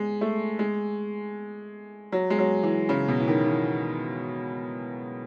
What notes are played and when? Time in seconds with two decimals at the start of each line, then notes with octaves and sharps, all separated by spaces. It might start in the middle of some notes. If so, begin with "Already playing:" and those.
Already playing: G#3
0.21 A3
0.59 G#3
2.12 F#3
2.30 G#3
2.38 F#3
2.63 E3
2.89 C#3
3.08 B2
3.20 E3
3.28 D#3
3.47 E3